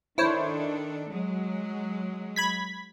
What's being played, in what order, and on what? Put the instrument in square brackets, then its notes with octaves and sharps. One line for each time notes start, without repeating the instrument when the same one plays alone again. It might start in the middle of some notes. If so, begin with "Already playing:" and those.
[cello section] D#3 D4 A4 [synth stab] E4 C5 C#5
[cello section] F#3 G#3
[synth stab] B5 G#6 B6